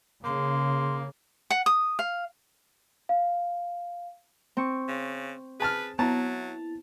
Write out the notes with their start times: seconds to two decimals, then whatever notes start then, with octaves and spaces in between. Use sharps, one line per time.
0.24 C#3 A#3 C6
1.50 F#5
1.66 D#6
1.99 F5
3.09 F5
4.57 C4 C#6
4.88 C#3
5.60 G#4 B4 A5 F6
5.99 F#3 B3 E4 A5 A#5